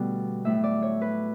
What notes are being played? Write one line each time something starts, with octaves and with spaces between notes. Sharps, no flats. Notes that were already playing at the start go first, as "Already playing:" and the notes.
Already playing: B2 D3 G3 A3 B3
A2 F#3 A3 E5
D5
C#5
B4